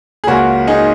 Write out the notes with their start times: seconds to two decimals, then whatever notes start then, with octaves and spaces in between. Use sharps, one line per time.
0.24 G#4
0.27 C#2 C#3 A#3 C#4 F#4
0.67 D#4 G#4